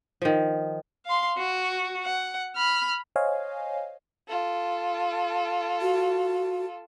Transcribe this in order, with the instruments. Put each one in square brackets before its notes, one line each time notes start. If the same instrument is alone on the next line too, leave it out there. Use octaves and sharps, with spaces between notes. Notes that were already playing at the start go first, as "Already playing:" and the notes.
[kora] D#3 F3
[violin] F5 C6
F#4
F#5
B5 F6
[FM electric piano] C5 C#5 D#5 F5 G#5
[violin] F4 A4
[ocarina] F#4